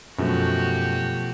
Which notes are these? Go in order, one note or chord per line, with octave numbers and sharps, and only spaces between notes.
F#2 B2 F3 A3 F#4 G4